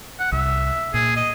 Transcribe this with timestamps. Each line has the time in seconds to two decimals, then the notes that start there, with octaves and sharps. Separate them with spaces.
0.19 F#5
0.32 C2 E5
0.94 A#2 G#4
1.17 D#5